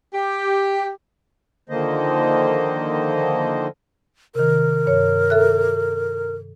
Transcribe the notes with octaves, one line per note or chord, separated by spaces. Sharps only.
G4
D3 D#3 F3 A#3 C5 D#5
C3 D#3 A#4
G2 C#5
A4 E5 F#6